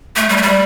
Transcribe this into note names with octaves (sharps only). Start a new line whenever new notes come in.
A3
G3
A3
G3